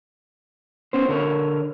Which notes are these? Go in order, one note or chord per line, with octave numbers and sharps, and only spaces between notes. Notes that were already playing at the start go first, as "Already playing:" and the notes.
B3 C#4 C5
D3 A#4 C#5